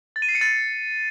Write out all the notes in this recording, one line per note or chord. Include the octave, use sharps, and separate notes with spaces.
A6
D#7
C7
C#7
A6